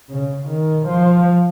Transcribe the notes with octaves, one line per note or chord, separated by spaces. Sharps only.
C#3
D#3
F3